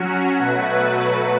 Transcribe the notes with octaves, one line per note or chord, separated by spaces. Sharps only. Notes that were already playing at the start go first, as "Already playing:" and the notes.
Already playing: F#3 C#4 F#4
B2 F#3 A3 F#4 B4